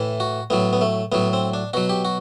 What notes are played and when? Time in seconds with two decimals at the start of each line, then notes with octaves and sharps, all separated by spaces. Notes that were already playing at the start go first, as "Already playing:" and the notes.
Already playing: A2 E3
0.20 F#4
0.50 A2 F#3 B3
0.73 B3
0.81 A3
1.12 A2 F#3 B3
1.33 C4
1.54 D4
1.73 B2 F#3 F#4
1.89 G4
2.05 F#4